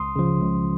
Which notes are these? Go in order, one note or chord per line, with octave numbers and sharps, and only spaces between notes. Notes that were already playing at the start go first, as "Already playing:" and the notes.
Already playing: C#2 C6 D#6
C#3 F3
C#2